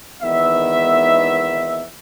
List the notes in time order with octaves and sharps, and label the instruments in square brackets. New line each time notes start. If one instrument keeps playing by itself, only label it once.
[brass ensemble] G#1 E2 D#3 B3 E5